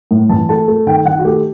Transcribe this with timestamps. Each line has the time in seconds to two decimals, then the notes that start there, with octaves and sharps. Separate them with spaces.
0.11 A2
0.29 E3 A5
0.49 A3 A5
0.68 A3
0.87 D#3 G5
1.05 D#3 F#5
1.19 F#4
1.25 A3 G4